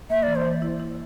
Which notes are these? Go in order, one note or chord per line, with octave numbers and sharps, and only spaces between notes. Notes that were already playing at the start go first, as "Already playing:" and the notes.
A#3 E5
E3 D5
C5
E3
E4
E4